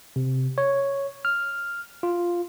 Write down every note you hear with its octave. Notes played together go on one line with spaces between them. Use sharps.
C3
C#5
F6
F4